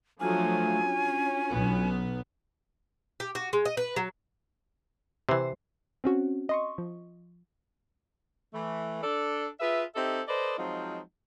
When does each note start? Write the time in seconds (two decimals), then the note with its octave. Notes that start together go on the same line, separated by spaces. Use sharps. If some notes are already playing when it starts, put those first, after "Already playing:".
0.20 F3 F#3 A3 D4 F4 F#4 G#5
0.86 C#4
1.50 B1 B3
3.20 G4
3.35 F#4
3.53 G#3
3.65 D#5
3.77 B4
3.96 F#3
5.29 C3 E3 C5
6.04 C4 C#4 F#4
6.49 D#5 C6 C#6
6.78 F3
8.54 E3 A3
9.03 D4 A4 D5
9.60 F4 G#4 B4 E5
9.96 C4 D#4 G4 A4 E5
10.28 A4 B4 C5 D5 D#5
10.58 F3 F#3 G#3 C4 D#4 F4